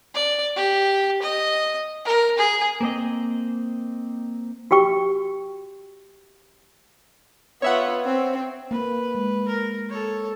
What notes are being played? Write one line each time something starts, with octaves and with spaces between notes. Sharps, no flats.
D5
G4
D#5
A#4
G#4
A#3 C4 D#5
F#4 G4 G5 C#6
B3 F4 C#5 E5 F#5
C4
A#3 B4
G#3
A#4
A4 C#5